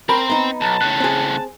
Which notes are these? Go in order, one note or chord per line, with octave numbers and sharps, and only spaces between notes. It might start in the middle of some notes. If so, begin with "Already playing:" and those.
C4 A#4 A#5 B5
B3 D#4
B1 A5
A2 C#3 F#6
C4 G#4